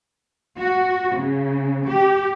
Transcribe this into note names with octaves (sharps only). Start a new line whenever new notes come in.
F#4
C#3
G4